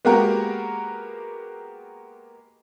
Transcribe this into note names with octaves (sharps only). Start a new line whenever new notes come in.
G#3 A#3 B3 F#4 G4 A#4